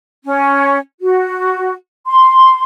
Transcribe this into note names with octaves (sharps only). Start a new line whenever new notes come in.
C#4
F#4
C6